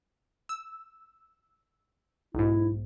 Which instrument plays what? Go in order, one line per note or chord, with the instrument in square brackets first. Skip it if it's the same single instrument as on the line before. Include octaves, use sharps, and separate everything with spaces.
[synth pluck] E6
[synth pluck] B1 G#2 [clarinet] E4